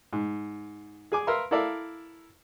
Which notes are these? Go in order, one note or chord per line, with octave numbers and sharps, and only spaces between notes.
G#2
G#4 G#5 D6
A#4 B4 E5 F5 C6
E4 A4 A#4 D5 E5 F5